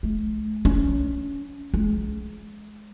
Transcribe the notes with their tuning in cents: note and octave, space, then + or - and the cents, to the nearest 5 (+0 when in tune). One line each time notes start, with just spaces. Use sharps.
A3 -40
C#4 +20
G#3 +25